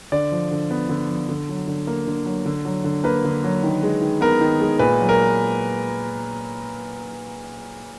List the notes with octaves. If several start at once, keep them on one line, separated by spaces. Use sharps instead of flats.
D3 D5
F3
D3
B3
D3
F3
D3
F#3
D3
A#3
D3
F#3
D3
F#3
D3
A#3 B4
D3
F#3
D#3
G#3
D#3
B3 A#4
D#3
G#3
A#2 B4
F#3
A#4